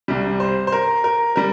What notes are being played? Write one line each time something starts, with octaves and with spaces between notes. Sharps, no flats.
C2 C3 G3
C5
C5
A#4
A#4
G3 A#4